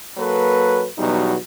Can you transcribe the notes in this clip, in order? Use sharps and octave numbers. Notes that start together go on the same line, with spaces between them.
F#3 A#3 A4 B4
E2 B2 F#3 G3 D#4